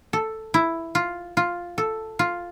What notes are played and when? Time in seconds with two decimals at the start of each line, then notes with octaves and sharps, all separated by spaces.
0.13 A4
0.54 E4
0.95 F4
1.37 F4
1.78 A4
2.19 F4